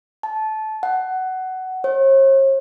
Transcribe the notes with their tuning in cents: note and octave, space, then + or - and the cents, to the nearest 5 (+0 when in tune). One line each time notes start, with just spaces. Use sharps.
A5 -20
F#5 +15
C#5 -45